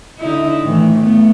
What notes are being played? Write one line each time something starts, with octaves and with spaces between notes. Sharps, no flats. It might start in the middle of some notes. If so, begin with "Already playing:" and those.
D3 D#4 E4
A2 D#3 E3
A3 B3